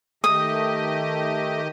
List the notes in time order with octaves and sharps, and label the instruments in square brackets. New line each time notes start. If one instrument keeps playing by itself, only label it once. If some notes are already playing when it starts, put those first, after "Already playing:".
[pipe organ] D#3 G4 D#5 [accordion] A3 [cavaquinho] D#6